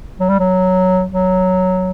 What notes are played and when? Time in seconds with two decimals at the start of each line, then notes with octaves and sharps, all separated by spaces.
0.20 F#3
0.29 G3
0.40 F#3
1.12 F#3